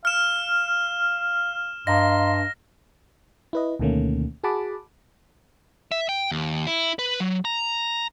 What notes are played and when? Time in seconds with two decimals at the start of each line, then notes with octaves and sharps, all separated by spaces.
0.05 F5 F6 E7
1.87 G2 D#5 F5 A#5 C6 A#6
3.53 E4 B4 D#5
3.80 D2 B2 D#3 A3 A#3 C#4
4.44 F#4 G#4 F#5 A5 B5 D6
5.92 E5
6.09 G5
6.31 D#2
6.66 E4
6.99 B4
7.20 F#3
7.45 A#5